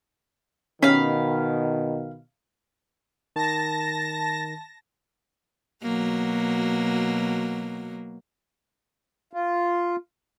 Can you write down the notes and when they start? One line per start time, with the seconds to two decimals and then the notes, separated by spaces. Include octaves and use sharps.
0.83 B2 D#3 C#4 F5 B5
3.36 D#3 A5 A#6
5.83 B2 F#3 A#3
9.33 F4